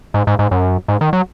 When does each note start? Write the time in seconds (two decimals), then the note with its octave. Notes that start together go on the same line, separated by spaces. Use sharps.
0.14 G#2
0.27 G#2
0.39 G#2
0.51 F#2
0.88 G#2
1.01 D#3
1.13 F#3